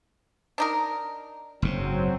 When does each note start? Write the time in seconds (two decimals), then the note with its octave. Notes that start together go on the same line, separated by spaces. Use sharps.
0.58 D4 D#4 A#4
1.62 F#1 G#2 F#3 C4